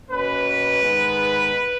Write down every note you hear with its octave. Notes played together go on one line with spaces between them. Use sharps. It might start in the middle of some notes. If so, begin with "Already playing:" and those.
B2 A#3 C#4 B4
G#2 D#3 G#3 B3 D#4